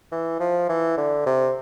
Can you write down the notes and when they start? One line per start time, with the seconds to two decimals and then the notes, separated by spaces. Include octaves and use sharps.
0.12 E3
0.40 F3
0.69 E3
0.97 D3
1.26 C3